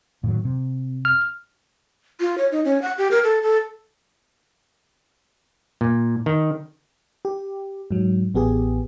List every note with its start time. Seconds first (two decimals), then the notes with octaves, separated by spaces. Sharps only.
0.24 A2 D#3 F#3
0.45 C3
1.05 F6
2.21 F4
2.38 C#5
2.52 D#4
2.65 C#4
2.82 F#5
2.98 G4
3.11 A#4
3.24 A4
3.43 A4
5.81 A#2
6.26 D#3
7.25 G4
7.91 G#2 F#3
8.34 A1 B3 G4 G#4